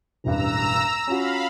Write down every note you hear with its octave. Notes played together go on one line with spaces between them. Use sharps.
E1 A1 G2 A#5 E6
C#4 F4 F#4 F5 B5